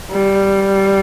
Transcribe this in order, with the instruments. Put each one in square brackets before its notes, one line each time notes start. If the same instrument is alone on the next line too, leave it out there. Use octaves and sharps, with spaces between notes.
[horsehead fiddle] G3